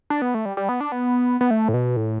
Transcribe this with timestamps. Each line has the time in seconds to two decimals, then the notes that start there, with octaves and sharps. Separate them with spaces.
0.10 D4
0.22 B3
0.34 A3
0.45 G3
0.57 G3
0.69 B3
0.80 D4
0.92 B3
1.41 B3
1.51 A3
1.68 A2
1.74 B2
1.97 A2